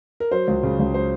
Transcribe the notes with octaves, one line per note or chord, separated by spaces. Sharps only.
A#4
F#3 C5
C#2
C#3
C#2
F#3 C5